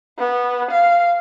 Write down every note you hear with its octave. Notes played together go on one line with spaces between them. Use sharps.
B3
F5